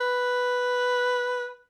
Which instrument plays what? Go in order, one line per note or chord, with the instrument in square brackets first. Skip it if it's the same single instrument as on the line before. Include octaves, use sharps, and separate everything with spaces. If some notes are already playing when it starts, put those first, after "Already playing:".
[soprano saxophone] B4